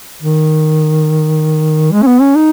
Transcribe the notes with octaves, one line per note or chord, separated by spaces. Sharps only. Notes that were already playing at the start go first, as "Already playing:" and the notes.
D#3
G#3
C#4
B3
C#4
D#4